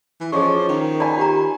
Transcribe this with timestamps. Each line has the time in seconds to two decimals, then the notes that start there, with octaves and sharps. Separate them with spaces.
0.21 E3
0.32 F3 C#4 G#4 C5 D#5 C#6
0.69 D#3
1.00 D5 G#5 B5
1.17 F4 G4 A#5